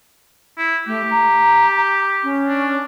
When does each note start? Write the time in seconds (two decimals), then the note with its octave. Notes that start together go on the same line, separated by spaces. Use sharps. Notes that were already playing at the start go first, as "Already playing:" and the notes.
0.58 E4
0.87 A3 G4
1.11 A#5
2.23 C#4
2.46 D4